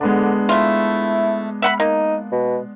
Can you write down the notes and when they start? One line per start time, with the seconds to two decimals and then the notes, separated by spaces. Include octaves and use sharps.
0.01 D3 G#3 B3 D4
0.49 A3 E4 F4
1.62 E5 F#5 B5
1.80 A#3 D#4
2.32 B2